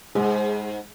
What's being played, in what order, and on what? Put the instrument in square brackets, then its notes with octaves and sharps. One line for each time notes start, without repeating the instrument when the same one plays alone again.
[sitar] G#2 [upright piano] G#3